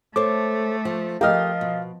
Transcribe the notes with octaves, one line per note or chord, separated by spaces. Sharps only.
A3 A4 C5 C#5 D6
F3
F3 A3 G4 A#4 D#5 F5 F6
B2